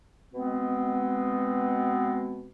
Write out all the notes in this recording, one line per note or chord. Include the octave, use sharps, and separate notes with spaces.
B2 G#3 B3 C4